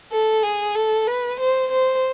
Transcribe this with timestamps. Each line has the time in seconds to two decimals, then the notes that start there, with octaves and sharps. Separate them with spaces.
0.12 A4
0.43 G#4
0.75 A4
1.07 B4
1.40 C5
1.71 C5